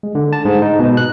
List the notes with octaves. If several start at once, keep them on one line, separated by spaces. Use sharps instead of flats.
G#3
D3
A5
G#2
D#4
B2
F#6